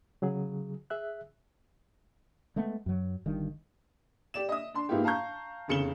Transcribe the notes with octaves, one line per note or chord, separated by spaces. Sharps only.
C#3 F#3 G#4
G#4 E5 F#6
G#3 A3 B3
F#2 F#3
G1 G2 D#3
G4 D5 E7
D#5 E5 D#6
D4 C6
G#2 A#3 B3 E4 F4 G4
F5 A5 A#5 C#6 G6
F1 E2 C#3 C#7 E7 G7